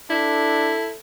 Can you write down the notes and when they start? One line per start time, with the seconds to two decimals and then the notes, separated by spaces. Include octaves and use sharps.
0.10 D4 E4 A4